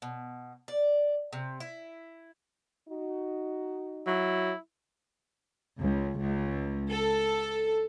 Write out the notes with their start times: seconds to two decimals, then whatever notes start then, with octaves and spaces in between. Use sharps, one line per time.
0.02 B2
0.68 D5
1.33 C3
1.60 E4
2.88 D#4 F#4
4.07 F#3 E4
5.79 C#2
6.19 C#2
6.91 A4